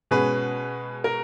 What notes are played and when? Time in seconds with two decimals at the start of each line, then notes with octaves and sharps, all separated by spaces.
0.11 B2 G#3 C#4 G#4 B4
1.04 A#4